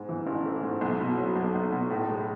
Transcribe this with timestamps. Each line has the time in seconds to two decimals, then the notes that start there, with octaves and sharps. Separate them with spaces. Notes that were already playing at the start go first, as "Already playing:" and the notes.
Already playing: G#2
0.09 E3
0.27 A1
0.46 A3
0.63 G#2
0.81 B1
1.00 B2
1.18 F#3
1.36 B1
1.55 B1
1.72 B2
1.90 A2
2.09 G#3